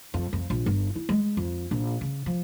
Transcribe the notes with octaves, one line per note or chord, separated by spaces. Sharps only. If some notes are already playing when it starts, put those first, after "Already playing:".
F2
F2
A#1
G1
E4
G#3
F2
A#1
C#3
F3